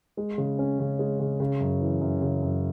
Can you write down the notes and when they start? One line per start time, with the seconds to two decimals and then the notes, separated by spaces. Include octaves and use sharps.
0.17 G#3
0.38 C#3
0.59 C#4
0.79 C#3
0.99 G#3
1.20 C#3
1.40 C#3
1.60 F#2
1.81 E3
2.01 F#2
2.22 C#3
2.43 F#2